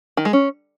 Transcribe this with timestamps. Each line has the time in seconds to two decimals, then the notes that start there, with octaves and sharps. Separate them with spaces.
0.17 D#3
0.25 G#3
0.33 C#4